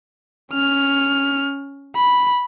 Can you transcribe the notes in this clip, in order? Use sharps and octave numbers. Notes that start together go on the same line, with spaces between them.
C#4 F6
B5